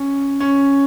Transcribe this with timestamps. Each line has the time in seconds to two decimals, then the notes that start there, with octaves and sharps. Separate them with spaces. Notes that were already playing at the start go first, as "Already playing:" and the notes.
Already playing: C#4
0.40 C#4